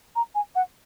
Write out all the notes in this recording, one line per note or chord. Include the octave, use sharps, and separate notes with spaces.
A#5
G#5
F#5